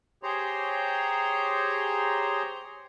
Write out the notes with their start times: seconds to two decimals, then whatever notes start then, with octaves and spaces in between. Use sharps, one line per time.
0.23 G4 G#4 C5 C#5 A#5 C6